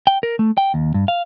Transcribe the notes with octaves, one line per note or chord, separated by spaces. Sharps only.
G5
A#4
A3
G5
D#2
G2
F5